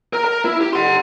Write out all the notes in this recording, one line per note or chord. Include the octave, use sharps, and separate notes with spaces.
A#4
A#4
E4
G4
F#5 C6